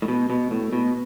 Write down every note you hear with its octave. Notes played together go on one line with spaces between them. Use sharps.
A2
B2
B2
A2
B2